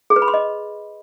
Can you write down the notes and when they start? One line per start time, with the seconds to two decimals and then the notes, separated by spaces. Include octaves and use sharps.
0.10 G#4
0.16 B4
0.22 B5
0.28 C6
0.34 D#5